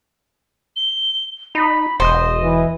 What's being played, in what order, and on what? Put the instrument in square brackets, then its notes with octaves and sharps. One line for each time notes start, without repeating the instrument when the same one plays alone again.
[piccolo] G7
[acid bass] D#4 [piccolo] B5
[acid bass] E1 [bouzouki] C5 [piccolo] D#5
[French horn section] E3